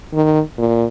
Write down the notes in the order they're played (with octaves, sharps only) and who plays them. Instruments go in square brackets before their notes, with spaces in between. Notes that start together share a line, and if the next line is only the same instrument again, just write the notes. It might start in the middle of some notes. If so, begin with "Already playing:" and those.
[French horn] D#3
A#2